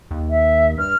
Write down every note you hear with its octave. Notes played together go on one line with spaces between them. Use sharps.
D#2
E5
G2 F6